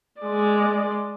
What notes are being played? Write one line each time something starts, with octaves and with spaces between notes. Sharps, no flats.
G#3 D5